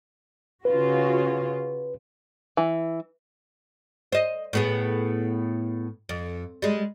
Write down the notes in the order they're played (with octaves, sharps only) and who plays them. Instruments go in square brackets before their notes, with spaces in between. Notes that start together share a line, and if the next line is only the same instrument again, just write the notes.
[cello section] C#3 F4 F#4 [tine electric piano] B4
[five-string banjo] E3
[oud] C5 D#5
A2 B3 G#4
F2
G3 G#3